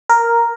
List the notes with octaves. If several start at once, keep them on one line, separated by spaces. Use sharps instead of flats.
A#4